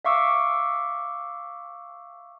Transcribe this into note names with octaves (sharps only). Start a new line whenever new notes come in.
E5 F5 C#6 D6 E6